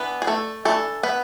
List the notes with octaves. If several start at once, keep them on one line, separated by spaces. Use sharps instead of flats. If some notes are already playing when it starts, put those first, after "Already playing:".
Already playing: E3 B3 D4 B4
G#4
A3 A4
E3 A3 D4 A4
B3 B4